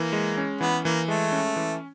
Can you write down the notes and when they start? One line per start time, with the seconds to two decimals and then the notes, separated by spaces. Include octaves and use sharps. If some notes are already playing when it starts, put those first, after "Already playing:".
Already playing: E3 A#3
0.13 G#3
0.38 C#4
0.61 E3 B3
0.84 E3 A#3
1.08 G#3 A3
1.32 C#4
1.56 E3